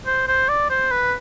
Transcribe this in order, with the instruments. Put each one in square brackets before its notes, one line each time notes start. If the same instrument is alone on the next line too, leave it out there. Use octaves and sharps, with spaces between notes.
[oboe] C5
C5
D5
C5
B4